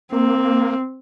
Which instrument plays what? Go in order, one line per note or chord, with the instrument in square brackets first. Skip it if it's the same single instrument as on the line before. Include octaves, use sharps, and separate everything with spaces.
[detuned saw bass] A#3 [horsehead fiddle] C4